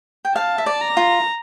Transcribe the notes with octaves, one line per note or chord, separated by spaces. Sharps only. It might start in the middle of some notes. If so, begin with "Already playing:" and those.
G5
F5 A5
E5
D5
A#5
F4